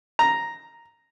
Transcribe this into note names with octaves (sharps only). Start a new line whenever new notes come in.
A#5